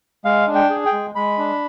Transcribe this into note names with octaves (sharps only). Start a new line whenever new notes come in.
G#3 F5
D4
G5
G#4
G5
G#3
G#3 B5
D4